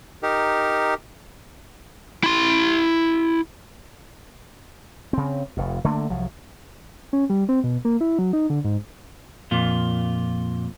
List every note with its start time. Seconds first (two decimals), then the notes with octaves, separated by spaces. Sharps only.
0.23 D#4 G4 A#4
2.24 E4 C6
5.13 C#3 C4
5.57 F1 F2
5.84 D3 A3 A#3 D4
6.10 C2 F3 F#3
7.13 C#4
7.30 G3
7.49 C4
7.64 B2
7.85 A#3
8.01 E4
8.19 F#3
8.33 D#4
8.50 D3
8.64 G#2
9.51 F2 A#2 F4